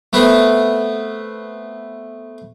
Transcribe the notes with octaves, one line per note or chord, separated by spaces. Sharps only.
A3 B3 C4 B4